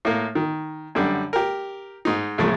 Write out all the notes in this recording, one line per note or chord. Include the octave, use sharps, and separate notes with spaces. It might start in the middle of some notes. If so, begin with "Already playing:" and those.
A2 A#3
D#3
F#2 D3 G3
G4 A#4
G#2 D#4
C2 F2 A2 G#3 A3